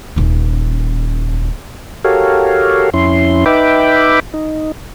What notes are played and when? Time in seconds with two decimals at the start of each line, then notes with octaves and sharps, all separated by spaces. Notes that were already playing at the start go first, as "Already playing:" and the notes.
0.16 D#1 C#4
2.04 F#4 G4 A4 A#4 C#5 F5
2.94 F2 C#4 E4 C6
3.46 D#4 B4 E5 G5 B5 D6
4.34 D#4